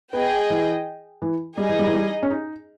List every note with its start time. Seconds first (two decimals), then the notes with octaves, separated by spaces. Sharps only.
0.13 B3 G#4 D#5 G5
0.50 E3
1.22 E3
1.57 G3 D#4 G#4 D#5
1.69 E3
1.79 G3
1.87 E3
1.94 G3
2.23 C#4
2.30 D#4